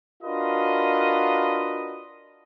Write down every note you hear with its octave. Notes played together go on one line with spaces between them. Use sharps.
D4 F4 F#4 A#4 B4 D#5